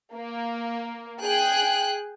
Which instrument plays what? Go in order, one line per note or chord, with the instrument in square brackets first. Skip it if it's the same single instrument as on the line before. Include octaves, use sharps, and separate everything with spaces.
[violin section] A#3
G#4 G5 F#6